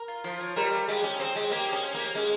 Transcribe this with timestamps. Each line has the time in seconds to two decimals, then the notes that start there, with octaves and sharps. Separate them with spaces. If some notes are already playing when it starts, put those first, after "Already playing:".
Already playing: A#4
0.08 F4
0.24 F3 F4
0.41 C#5
0.56 G3 A#4
0.72 F4
0.88 G#3 G4
1.03 C#4 D#5
1.20 C4 C5
1.36 G#3 G4
1.51 A#3 G4
1.68 C#4 D#5
1.83 C5
1.94 A#3 G4
2.15 G#3 C#4